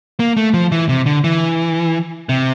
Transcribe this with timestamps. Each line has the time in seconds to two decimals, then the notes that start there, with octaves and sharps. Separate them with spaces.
0.20 A#3
0.37 A3
0.54 F3
0.72 E3
0.89 C3
1.06 D3
1.24 E3
2.29 C3